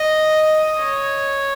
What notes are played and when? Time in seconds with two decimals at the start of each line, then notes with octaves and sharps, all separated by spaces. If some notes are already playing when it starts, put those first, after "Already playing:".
Already playing: D#5
0.79 C#5